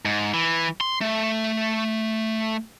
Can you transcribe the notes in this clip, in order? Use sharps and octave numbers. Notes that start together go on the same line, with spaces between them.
G#2
E3
C6
A3